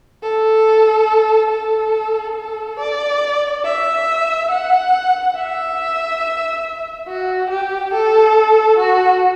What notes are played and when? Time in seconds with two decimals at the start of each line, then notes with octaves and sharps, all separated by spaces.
0.23 A4
1.51 A4
2.36 A4
2.80 D5
3.64 E5
4.51 F#5
5.35 E5
7.08 F#4
7.50 G4
7.93 A4
8.79 F#4